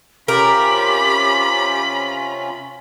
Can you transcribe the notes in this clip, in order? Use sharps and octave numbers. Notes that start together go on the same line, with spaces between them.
C3 C#4 F4 G4 A#4 B5